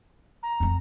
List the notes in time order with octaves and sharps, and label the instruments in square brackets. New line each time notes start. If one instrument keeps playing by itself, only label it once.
[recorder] A#5
[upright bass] F2 C4